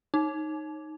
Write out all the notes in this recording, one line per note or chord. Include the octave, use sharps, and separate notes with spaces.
D#4